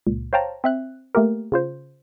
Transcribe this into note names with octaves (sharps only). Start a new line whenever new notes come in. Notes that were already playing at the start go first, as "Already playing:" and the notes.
C#2 A#2
C5 C#5 F5 G5 A5 A#5
C4 E5 F#6
A3 A#3 G4 A#4
C#3 F4 C5